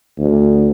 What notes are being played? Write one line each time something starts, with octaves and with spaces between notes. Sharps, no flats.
D2